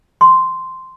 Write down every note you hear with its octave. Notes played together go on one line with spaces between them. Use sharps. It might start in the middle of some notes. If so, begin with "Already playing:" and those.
C6